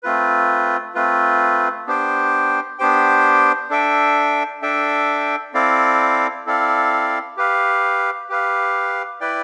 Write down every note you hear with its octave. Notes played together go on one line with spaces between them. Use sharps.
A3 C4 F4 B4
A3 C4 F4 B4
B3 D4 G4 C5 G5
B3 D4 G4 C5 G5
D4 A4 E5 G5
D4 A4 E5 G5
C4 E4 A4 D5 F5
C4 E4 A4 D5 F5
G4 B4 F5
G4 B4 F5
E4 B4 D5 G5